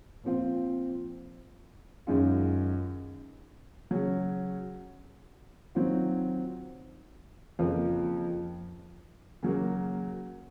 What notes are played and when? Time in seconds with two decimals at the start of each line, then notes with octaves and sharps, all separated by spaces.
0.23 A#2 F3 C4 F4
2.07 F#2 D#3 G#3 C#4 F4
3.91 C#3 F#3 C#4
5.75 D#3 F#3 C4 F4
7.59 F2 C#3 F3 A#3 F4
9.43 C#3 F#3 A#3